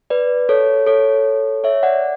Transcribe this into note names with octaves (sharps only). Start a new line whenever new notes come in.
B4 D5
A4 C#5
A4 C#5
C#5 E5
D5 F#5